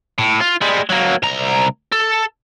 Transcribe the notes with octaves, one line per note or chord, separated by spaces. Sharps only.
A2
F4
G3 G#3
F#3 A#3
C2 A#5
A4